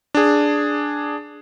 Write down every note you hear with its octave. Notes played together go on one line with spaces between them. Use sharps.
D4 G#4